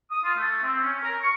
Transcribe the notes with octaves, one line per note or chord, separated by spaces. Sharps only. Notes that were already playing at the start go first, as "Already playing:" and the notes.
D#6
F4
A3
C4
C#4
A#4
C#6